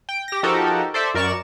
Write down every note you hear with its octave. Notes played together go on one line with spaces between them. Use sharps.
G5
G4 A#6
F3 D#4 F#4 G4 A4 A#4
A4 C5 D5 E5
F#2 A#4 D5 C#6 E7